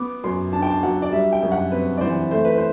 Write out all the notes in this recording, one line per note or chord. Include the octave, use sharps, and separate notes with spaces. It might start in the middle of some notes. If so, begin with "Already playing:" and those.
Already playing: B3 D6
F#2 C6
D4 A5
G5
A5
F#3 F#5
D5
G3 E5
G5
F#2
F#5
C4 B4
D5
E3 C5
A3 C5
B4
C5